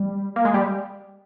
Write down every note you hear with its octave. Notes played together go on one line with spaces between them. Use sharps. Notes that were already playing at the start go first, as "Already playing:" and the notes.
Already playing: G3
A#3
G#3
G3